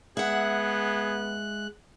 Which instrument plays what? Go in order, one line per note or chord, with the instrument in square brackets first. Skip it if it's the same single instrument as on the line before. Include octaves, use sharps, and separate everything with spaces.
[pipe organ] G#3 F#6 [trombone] B3 [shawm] G#4 [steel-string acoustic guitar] E5 F#5